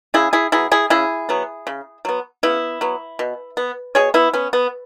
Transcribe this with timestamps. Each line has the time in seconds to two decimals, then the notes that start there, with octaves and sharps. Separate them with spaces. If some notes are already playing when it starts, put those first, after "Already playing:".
0.14 C#3 E4 G#4
0.33 E4 G#4
0.52 F#3 B3 E4 G#4
0.72 E4 G#4
0.90 C#3 E4 G#4
1.29 F#3 B3
1.67 C#3
2.05 F#3 B3
2.43 C#3 B3 E4
2.81 F#3 B3
3.19 B2
3.57 B3
3.95 B2 G#4 C#5
4.14 B3 E4
4.33 B3 C#4
4.53 B3